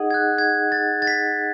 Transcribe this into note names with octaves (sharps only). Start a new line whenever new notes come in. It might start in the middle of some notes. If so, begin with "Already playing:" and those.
Already playing: D#4 G#4 D#5 F#5
G#6
F#6
G#6
A6
A6
B6